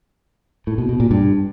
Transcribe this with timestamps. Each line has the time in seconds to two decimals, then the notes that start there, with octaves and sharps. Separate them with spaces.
0.67 A2
0.78 B2
0.89 B2
1.00 A#2
1.11 G2